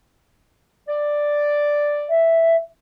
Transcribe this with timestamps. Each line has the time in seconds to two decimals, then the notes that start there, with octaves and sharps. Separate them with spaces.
0.89 D5
2.09 E5